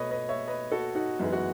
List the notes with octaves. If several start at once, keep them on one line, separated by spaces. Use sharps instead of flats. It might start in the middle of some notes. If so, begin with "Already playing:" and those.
Already playing: B2 A3 B4 C#5 D#5
B4 D#5
C#5 E5
B4 D#5
F#4 A4
D#4 F#4
F#2 E3 G#3 B3 D#4
F#4